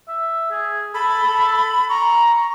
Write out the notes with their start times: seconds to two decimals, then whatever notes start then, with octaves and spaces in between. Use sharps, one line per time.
0.08 E5
0.51 G#4
0.94 A4 B5
1.24 A4
1.89 A#5 C#6
2.35 C#6